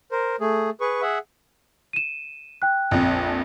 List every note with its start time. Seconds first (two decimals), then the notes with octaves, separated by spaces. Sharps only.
0.12 A#4 C5
0.40 A3 G#4
0.81 G#4 B4 C#6
1.02 G#4 E5 F#5
1.93 D#7 E7
2.62 G5 F#6
2.91 A#1 F2